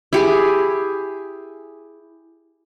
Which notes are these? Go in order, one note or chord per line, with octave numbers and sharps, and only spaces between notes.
E4 G4 G#4 G#5